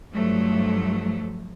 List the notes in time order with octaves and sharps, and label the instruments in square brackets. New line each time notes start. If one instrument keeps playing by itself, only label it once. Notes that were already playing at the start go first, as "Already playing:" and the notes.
[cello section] G2 F3 F#3 A3